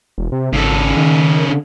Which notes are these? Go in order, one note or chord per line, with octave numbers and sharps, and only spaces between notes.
E1
C3
G#1 C#3 A4
D#3
D3